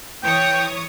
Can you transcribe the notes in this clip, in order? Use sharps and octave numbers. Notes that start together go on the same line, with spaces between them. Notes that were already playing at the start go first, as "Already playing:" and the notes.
E3 C#5 G5 D#6